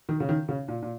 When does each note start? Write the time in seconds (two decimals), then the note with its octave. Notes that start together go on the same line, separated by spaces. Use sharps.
0.09 D#3
0.20 C#3
0.29 D#3
0.49 C#3
0.68 A#2
0.82 A#2